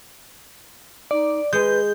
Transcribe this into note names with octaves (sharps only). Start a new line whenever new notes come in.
D#4 D5
G#3 B4 G6